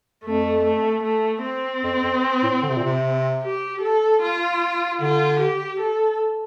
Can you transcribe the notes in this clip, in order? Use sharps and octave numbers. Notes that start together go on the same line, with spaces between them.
F2 A3
A3
A3
C4
F2
F2
A2
D3
C3
A#2
C3
G4
A4
F4
D3 F4
G4
A4